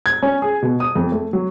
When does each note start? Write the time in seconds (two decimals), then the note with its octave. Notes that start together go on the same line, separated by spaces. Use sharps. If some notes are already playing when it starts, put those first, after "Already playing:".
0.06 G#6
0.22 C#4
0.42 G#4
0.62 B2
0.80 D#6
0.95 F2
1.12 A3
1.33 F#3